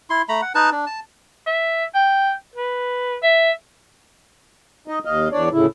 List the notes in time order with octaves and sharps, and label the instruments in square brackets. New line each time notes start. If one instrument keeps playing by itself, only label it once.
[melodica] E4 C6
A3 A#5 B5
F#5
D#4 B4 A5
D4
A5
[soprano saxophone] E5
G5
B4
E5
[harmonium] D#4 D#5
D#2 D#5 F5
E2 D4 C#5 D5
D2 A2 C#3 E4